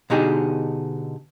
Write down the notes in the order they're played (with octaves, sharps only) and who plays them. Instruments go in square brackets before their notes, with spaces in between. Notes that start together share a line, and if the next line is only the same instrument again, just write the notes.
[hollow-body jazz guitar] B2 D3 D#4 G4 G#4